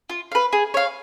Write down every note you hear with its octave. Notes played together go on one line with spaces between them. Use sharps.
F4
B4 F5
G#4
C#5 F5